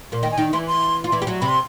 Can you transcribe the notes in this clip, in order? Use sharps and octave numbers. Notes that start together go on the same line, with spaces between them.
A#2 A#3
D#3 D#4 G5
G#5
D#3 D#4 G5
E3 E4 C6
C6
F4
E3 E4
G4
F#3 F#4
C3 C4 B5
C6